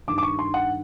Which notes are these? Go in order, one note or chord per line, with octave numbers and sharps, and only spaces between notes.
G2 D#3 D6
D6
C#6
C6
F#5